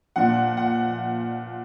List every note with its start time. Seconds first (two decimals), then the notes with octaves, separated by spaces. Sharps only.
0.16 A#2 F3 F#5
0.57 F#5